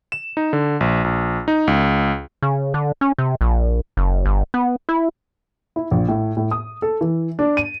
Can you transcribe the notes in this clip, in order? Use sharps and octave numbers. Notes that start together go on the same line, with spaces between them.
E7
D#4
D3
A#1
A#1
D#4
C#2
C#3
D3
C#4
C3
A#1
F#1
G1
B3
E4
E4
A#1
A2
A2
D#6
A4
E3
D4
D#7